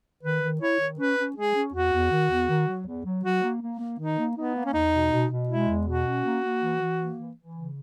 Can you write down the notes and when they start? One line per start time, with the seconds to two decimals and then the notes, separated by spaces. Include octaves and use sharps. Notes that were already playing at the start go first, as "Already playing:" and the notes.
0.23 D#3 B4
0.42 D#3
0.61 E4 C#5
0.79 D#3
0.98 C#4 B4
1.17 C#4
1.36 G#3 G#4
1.54 C#4
1.73 E2 F#4
1.92 E2
2.11 D#3
2.30 E2
2.48 D#3
2.67 F#3
2.87 E2
3.04 F#3
3.24 F#3 F#4
3.43 A#3
3.62 A#3
3.80 A#3
3.99 D#3 D#4
4.18 A#3
4.36 B3 D#4
4.55 A#3
4.65 C#4
4.73 E2 D#4
4.93 B2
5.12 B2
5.30 B2
5.49 G#3 E4
5.68 E2
5.87 B2 F#4
6.05 C#4
6.25 A#3
6.44 A#3
6.62 E3
6.80 E3
6.99 A#3
7.19 E3
7.36 E3
7.55 C#3